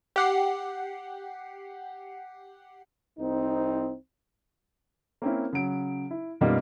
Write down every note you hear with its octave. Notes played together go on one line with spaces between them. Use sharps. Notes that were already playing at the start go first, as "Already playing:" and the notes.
G4 F#5 C7
C2 C4 D#4
A#3 C4 C#4 E4
C#3 F#3 D7
E4
F#2 B2 G3 A#3 D#4 F4